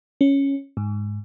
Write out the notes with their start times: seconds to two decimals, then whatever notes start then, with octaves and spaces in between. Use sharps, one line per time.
0.21 C#4
0.77 G#2